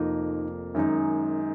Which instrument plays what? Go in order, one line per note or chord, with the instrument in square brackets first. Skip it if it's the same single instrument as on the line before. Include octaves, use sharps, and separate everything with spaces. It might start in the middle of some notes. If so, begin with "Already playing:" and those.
Already playing: [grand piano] F1 F2 F3 A#3 [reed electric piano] D#4
[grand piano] F#2 D#3 G#3 D#4 [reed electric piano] C#4